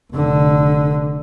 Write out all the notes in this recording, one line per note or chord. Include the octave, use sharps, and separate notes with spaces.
F1 D3